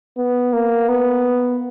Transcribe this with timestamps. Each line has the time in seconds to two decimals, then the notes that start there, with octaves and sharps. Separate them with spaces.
0.17 B3
0.53 A#3
0.88 B3